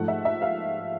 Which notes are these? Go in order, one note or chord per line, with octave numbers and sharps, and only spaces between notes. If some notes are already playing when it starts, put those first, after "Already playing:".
Already playing: G#2 F3 A3 F#5
E5
E5
F5